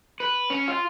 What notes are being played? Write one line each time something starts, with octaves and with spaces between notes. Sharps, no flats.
B4
C#4
F4